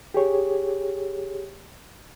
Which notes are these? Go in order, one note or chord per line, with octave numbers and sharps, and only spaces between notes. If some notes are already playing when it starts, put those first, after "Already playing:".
G4 G#4 C#5